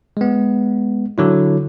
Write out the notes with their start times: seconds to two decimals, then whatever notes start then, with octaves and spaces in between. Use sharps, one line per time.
0.17 G#3 B3
1.18 D3 F#3 E4